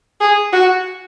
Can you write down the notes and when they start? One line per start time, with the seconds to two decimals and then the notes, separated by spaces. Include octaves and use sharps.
0.20 G#4
0.52 F#4